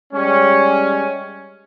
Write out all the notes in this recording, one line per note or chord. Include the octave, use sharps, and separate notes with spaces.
G3 G#3 C#4